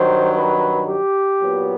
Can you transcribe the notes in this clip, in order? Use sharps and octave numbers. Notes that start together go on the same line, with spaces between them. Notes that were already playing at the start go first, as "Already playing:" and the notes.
Already playing: G2 D#3 F#3 C5
B4
G4
A#2 F#3 B3